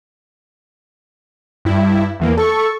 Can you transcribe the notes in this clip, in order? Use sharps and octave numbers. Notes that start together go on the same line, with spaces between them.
G2 E4
E2 E3 A#3
A4 C#6